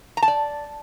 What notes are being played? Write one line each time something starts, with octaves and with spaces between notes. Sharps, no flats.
A#5
A5
D5